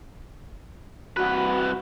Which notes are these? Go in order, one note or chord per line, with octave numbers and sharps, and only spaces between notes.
C2 F#4 B4